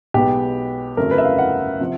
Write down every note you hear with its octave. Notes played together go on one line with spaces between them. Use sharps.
B1 B2 G#3 B3 G4
G1 F2 C#3 F#3 A3 A#4
B4
E5
F5
F#5
C3 F3